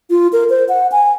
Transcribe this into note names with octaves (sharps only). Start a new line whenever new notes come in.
F4
A#4
C5
F#5
G#5